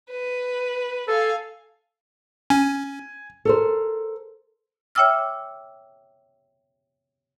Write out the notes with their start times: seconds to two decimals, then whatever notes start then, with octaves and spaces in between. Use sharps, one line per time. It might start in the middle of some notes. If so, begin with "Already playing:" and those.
0.11 B4
1.08 A4 F5 G#5
2.50 C#4 G#5
3.45 A4 A#4 C5
4.95 C#5 E5 G5 D6 E6 F6